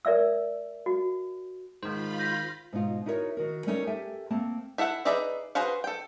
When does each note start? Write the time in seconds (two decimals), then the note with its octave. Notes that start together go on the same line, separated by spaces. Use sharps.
0.05 A#4 D5 E5 E6
0.86 F#4
1.83 G#2 D#3 F4 C5 B5
2.19 G6 A#6
2.73 G#2 B2 D#4 F4
3.06 D#4 E4 F#4 A#4 C5 C#5
3.37 D#3 F#4 A#4
3.66 G3 A3 C#4 D#4 A4 A#4
3.87 G4 A4 A#4 E5 G5 G#5
4.30 A3 A#3 C4 A5
4.78 E4 A4 E5 F#5
5.05 D#4 G#4 B4 D5 E5
5.55 F#4 G#4 B4 C5 F5
5.84 A4 G5